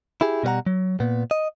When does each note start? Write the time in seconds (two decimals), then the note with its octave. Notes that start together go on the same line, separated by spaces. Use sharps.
0.21 E4 G4 G#4
0.43 B2 G3 B4 F#5 A#5
0.67 F#3
1.00 A#2 B3
1.31 D#5